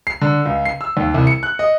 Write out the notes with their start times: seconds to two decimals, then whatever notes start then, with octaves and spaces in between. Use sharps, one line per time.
0.07 C7
0.21 D3
0.45 C#2
0.65 C7
0.81 E6
0.97 D#2
1.14 C2
1.27 C#7
1.43 F#6
1.59 D#5